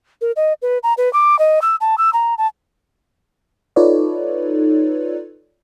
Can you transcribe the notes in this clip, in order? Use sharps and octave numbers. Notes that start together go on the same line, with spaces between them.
A#4
D#5
B4
A#5
B4
D6
D#5
E6
A5
E6
A#5
A5
D#4 F4 A4 B4 C#5 D5